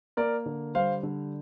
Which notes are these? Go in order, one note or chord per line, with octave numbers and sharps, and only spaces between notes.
A#3 A#4 D5
D3
G3 C5 F5
D3